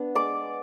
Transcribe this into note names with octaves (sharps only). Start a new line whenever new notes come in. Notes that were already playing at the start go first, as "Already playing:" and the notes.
Already playing: B3 D4
G#3 D5 D6